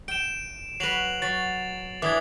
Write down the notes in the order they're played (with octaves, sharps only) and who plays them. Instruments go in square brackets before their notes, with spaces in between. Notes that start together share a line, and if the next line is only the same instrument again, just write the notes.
[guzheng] G5 [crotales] D7 E7
[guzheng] F#3 B4 [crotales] C7 F7 F#7
[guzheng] F#3 [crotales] A6
[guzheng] E3 D4 [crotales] D6 D#6 G#6